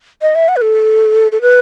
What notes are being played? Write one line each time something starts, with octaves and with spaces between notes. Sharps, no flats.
D#5
E5
F#5
B4
A4
A4
B4